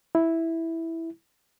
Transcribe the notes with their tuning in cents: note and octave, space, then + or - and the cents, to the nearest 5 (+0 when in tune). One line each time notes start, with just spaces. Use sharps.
E4 -5